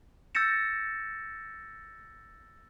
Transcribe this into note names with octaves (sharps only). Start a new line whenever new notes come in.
E6 G6 A6 A#6 C#7 E7